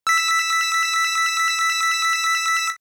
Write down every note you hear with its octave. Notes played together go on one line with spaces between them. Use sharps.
E6 B6